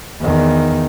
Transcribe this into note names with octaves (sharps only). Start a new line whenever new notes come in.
E2 D#3